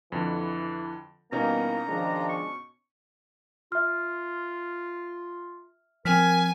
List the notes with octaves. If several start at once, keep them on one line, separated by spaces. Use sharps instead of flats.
F2 D3 E3
B2 E3 G3 A#3 B3 C#4 D#4 A#5
D#3 F3 G#3 D4
C#6
F4 E5 F6
F3 C4 A#4 G#5 F6 B6